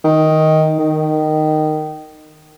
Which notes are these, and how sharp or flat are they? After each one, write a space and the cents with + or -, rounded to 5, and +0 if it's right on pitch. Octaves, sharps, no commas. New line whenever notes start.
D#3 +10
D#3 -15